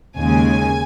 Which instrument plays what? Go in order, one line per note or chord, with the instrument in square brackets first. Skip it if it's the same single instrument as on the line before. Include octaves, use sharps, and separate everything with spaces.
[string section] D#2 C#3 G#3 G#5